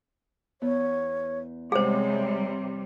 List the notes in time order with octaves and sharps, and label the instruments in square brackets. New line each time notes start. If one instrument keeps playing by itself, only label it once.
[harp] E2 B3 [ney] C#5
[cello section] C3 G3 [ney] G#3 [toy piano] G#4 C5 [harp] C#5 F#5